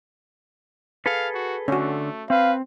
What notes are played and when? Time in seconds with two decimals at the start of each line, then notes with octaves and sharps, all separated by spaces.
1.06 G#4 A4 B4 F5
1.34 F#4
1.68 D3 A3 C#4 F#4
2.30 C4 B4 F5